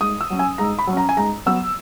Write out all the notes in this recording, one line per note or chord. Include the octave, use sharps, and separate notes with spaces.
G#2 D#6
E6
F#3 C#4
G#5
G#2 A#5
B5
F#3
C#4 A#5
G#5
G#2 A#5
F#3 B3 E6